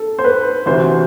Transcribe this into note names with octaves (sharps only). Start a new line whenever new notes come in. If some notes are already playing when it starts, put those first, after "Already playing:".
Already playing: A4
C5
B4
D2 C3 E3 C5